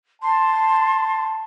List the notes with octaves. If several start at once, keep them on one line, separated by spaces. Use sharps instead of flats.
A5 C6